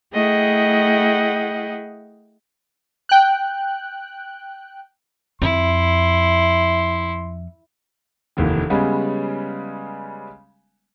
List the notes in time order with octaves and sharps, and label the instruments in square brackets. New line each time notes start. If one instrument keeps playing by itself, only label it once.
[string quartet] A3 E4 G#4 D#5 F#5 G5
[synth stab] G5 F#6
[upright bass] F2 [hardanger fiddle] E4 [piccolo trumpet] C6
[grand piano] F1 D#2 E3
C#3 G3 G#3 B3 C#4